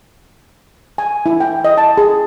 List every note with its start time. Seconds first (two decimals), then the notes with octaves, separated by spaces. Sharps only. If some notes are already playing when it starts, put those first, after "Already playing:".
0.98 G#5
1.26 E4
1.40 G5
1.65 D#5
1.78 A5
1.97 G#4